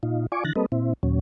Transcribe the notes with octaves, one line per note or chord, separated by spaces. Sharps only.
A#2 D#4 F4
F4 D5 G#5 C#6 D6
D3 E3 F#6 A6 A#6
G3 A#3 C4 A4 B4 D#5
A#2 C4 E4
D#2 A#2 F#3 C#4